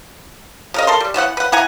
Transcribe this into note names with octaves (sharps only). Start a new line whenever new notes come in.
C#3 A#4 D#5
A4 A#4 C6
G3
E3 B3 C5 F#5
B4 F#5
E4 F#5 G#5 A#5